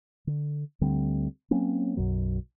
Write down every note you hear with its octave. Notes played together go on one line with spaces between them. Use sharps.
D3
D2 D3 G3 C4
F#3 A#3 C4 C#4
B1 F#2 F#3